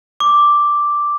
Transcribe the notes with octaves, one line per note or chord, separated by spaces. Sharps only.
D6